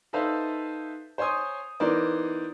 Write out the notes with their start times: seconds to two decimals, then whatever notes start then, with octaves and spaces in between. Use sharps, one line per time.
0.13 D#4 A4 B4 C5 E5 F5
1.18 C5 C#5 G#5 C6 D#6
1.80 E3 B3 D#4 A#4 C5 D5